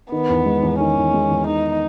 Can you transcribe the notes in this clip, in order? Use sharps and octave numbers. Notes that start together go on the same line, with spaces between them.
D#3 B3
E2
G#3
E2
D#3 C#4
E2
G#3
E2
D#3 D#4